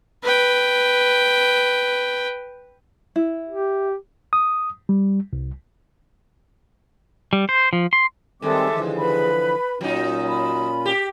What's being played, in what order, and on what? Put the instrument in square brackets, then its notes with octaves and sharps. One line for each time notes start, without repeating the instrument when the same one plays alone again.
[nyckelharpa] B4 G5
[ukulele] E4
[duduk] G4
[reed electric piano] D#6
G3
C2
[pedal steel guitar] G3
C5
F3
C6
[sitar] D#2 G#3 [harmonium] D#3 G3 C4 [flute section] A4 E5 D6
[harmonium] D3 E3 F3
[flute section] B4 B5
[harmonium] A#2 C#4 F4 [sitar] F#3 D#4
[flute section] B5
[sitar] G4